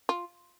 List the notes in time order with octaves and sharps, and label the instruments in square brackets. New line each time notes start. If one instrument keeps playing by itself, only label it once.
[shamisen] F4